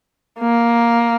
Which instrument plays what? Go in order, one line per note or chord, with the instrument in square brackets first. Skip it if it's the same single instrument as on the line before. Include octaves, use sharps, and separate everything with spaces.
[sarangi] A#3